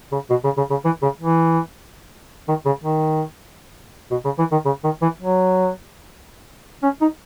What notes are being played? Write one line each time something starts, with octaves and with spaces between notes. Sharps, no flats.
C#3
B2
C#3
C#3
C#3
E3
C#3
E3
D#3
C#3
D#3
B2
C#3
E3
D#3
C#3
D#3
E3
F#3
C#4
D#4